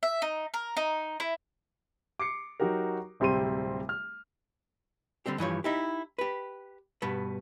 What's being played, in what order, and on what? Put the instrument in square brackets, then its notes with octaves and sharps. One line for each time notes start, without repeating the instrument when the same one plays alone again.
[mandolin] E5
D#4
A#4
D#4
E4
[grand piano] D6 C7 C#7
F#3 D#4 F#4 G4 A#4
D1 C3 G3 C4 C6 D#7
F6
[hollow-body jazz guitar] D3 G3 C4 G4
G2 E3 F3 C#5
D#4 E4 G4
G4 B4
G2 B2 B3